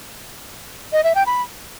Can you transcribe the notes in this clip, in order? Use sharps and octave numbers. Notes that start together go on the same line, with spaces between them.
D#5
E5
G5
B5